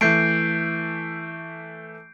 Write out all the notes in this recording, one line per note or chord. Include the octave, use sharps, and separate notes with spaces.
E3 A3 G6 C7 D7